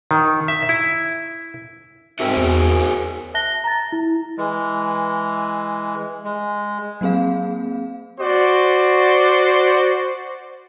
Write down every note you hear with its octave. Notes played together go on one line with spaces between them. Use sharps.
D#3
E5
E4
G#2 C4 F#4 A#4 C5 E5
E2 G#4
E5 A5 F#6 A#6 G7
A#5 A6
E4
E3 G#3
G#3
F#3 A#3 C4 G#4 F5
F#4 C5 D5